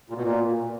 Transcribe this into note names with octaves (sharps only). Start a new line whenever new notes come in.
A#2
B2
A#2